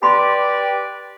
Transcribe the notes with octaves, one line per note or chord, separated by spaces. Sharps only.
G4 B4 D5 B5 C6